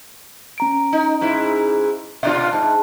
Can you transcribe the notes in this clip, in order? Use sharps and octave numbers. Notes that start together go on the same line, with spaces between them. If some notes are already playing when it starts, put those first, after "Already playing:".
C#4 A#5 D7
D#4
G#2 E4
B2 D4 F4 E5
G#2 A5